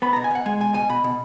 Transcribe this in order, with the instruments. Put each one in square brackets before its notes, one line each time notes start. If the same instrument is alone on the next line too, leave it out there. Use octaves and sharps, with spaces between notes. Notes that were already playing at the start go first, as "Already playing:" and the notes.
[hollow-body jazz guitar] B3 B5
B2 A#5
G#5
B2 F#5
G#3 G#5
B2 G#5
B2 G#5
B2 B5
B2